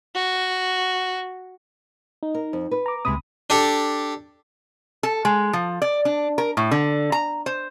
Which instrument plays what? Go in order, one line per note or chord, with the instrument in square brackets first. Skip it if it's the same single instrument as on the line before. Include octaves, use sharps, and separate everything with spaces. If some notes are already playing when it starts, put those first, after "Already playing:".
[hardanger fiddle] F#4
[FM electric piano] D#4
[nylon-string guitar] A#4
F2
B4
[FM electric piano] A#5 D6
[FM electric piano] C#2 B5 D#6 [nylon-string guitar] C3 G#3
[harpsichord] D4 G4 A4
[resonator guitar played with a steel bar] A4
G#3
F3
D5
D4
A#4
A2
D3
A#5
C5